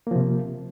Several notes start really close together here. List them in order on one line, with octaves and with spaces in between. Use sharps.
A#3 F3 C3